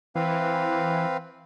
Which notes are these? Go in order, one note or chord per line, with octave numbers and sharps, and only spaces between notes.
E3 C4 B4 F5